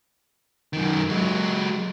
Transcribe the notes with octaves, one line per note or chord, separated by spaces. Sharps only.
F#2 D#3
F#3 G#3